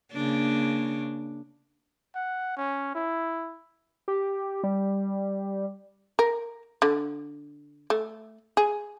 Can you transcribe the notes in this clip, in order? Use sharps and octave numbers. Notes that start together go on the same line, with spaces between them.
C#3 A#3 D4
F#5
C#4
E4
G4
G3
A#4
D3
A3
G#4